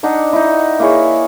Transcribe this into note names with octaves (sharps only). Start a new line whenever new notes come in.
D4 D#4 F#5
D#4 E4
A#3 E4 G#4 C#5